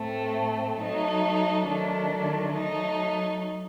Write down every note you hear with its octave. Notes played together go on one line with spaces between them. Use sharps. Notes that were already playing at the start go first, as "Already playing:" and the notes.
Already playing: A2 A3 C4
F#3 A3 D#4
D#3 F#3 A3 D4
F#3 A3 D#4